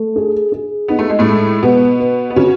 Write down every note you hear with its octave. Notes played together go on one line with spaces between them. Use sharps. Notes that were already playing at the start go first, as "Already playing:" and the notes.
Already playing: A3
G#4
G#4
B3 D#4
A3
G#3
A2 A3
G#3
B2 B3 B4
B4
B3
C#3 C#4 F#4